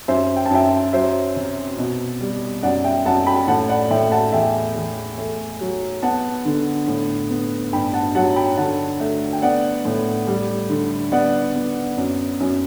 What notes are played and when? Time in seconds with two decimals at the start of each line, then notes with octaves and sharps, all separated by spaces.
0.08 F#2 C5 E5
0.36 G5
0.46 A5
0.51 F#2 E5 G5
0.93 F#3 C5 E5
1.36 C3
1.78 B2
2.21 G3
2.63 F#2 D5 F#5
2.84 E5 G5
3.06 F#2 F#5 A5
3.27 G5 B5
3.48 A2 F#5 A5
3.69 D5 F#5
3.91 A2 E5 G5
4.12 F#5 A5
4.32 E2 E5 G5
4.76 E2
5.18 A3
5.61 F#3
6.02 B3 F#5 A5
6.45 D3
6.88 A2
7.30 B3
7.73 G2 G5 B5
7.94 F#5 A5
8.15 F#3 F#5 A5
8.36 G5 B5
8.57 D3 F#5 A5
9.00 A3
9.33 G5
9.42 B3 D5 F#5
9.85 A2
10.27 G3
10.70 D3
11.12 B3 D5 F#5
11.55 B3
11.97 F#2
12.40 F#2